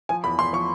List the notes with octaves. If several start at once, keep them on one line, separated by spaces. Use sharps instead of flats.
F3 G#5
E2 B5
E2 C6
F3 C#6